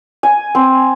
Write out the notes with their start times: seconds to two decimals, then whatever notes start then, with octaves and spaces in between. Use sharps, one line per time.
0.23 G#5
0.55 C4